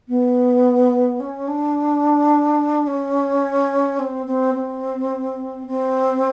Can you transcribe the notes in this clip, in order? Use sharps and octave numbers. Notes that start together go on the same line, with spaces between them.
B3
C#4
D4
C#4
C4
C4
C4
C4